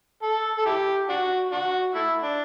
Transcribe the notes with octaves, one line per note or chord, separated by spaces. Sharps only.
A4
A4
E4 G4
D4 F#4
D4 F#4
A3 E4
D4